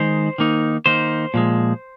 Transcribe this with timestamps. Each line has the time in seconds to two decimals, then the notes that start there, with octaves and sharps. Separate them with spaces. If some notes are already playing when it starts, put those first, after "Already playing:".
Already playing: D#3 G#3 D#4 C5
0.38 D#3 A#3 D#4
0.86 D#3 A#3 D#4 C5
1.34 A#2 F3 G#3